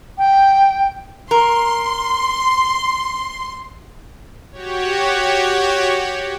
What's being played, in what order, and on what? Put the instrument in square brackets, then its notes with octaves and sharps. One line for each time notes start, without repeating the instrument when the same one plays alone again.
[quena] G5
[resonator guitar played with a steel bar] A#4 [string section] C6
[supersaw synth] F#4 G4 C#5